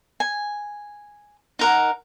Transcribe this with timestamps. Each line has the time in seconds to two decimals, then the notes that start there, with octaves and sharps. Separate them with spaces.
0.20 G#5
1.59 D#4 A#4 F#5